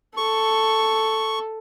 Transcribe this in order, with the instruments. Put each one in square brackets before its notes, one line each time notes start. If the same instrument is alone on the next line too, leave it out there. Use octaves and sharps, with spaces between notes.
[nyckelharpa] A4 [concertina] C#6